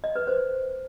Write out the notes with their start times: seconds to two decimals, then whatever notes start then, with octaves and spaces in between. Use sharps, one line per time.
0.04 D#5
0.16 B4
0.27 C5